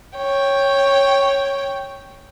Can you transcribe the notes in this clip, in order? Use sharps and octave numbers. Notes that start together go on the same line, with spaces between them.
C#5 G5